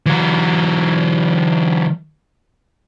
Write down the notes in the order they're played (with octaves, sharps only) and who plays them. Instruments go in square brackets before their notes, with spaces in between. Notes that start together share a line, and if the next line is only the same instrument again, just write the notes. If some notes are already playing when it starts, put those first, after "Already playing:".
[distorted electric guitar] E3 F#3